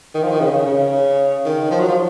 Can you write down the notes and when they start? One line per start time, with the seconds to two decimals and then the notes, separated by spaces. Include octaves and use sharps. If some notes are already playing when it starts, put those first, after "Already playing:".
0.15 D#3
0.23 F3
0.31 D#3
0.40 C#3
0.67 C#3
1.46 D#3
1.71 F3
1.80 F#3
1.89 F3